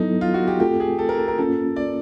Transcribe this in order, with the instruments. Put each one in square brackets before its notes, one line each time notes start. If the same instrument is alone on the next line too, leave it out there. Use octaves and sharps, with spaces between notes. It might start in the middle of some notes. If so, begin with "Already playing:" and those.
Already playing: [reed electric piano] F#3 B3 E4 A4 [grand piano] D#4
[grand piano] F4
F#4
G4
[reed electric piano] A3 C4 F4 A4 [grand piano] G4
[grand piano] G#4
A4
A#4
A4
A#4
[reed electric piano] A#3 C#4 F4 [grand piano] A4
[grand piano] D5